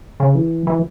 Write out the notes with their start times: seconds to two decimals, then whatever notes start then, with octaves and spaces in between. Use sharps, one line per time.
0.20 C#3
0.35 E3
0.67 E3